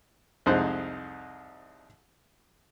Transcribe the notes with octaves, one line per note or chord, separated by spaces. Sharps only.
C2 F2 G#3 D#4 C5 F#6